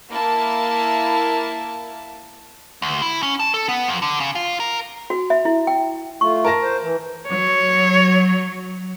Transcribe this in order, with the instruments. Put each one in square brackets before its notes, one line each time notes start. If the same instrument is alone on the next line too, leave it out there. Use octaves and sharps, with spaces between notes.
[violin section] A#3 E4 A5
[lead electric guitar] D2
E4
C#4
A5
A4
B3
F2
D3
C#3
F4
A#4
[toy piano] F#4
E5
E4
G5
[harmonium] A3 F4 [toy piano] C#6
[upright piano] A#4 A5 A#6
[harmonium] C5
E3
[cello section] F#3 [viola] C#5